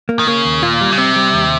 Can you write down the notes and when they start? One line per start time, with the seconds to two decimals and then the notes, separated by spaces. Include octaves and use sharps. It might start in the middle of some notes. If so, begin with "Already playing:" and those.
0.09 A#3
0.19 D#3
0.27 C#3 A#3
0.45 D#2
0.63 A#2 F4
0.81 G3
0.91 C#3
0.98 C3 C4
1.16 G3
1.34 D#2